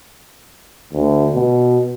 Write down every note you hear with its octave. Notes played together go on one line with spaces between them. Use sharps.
D2
B2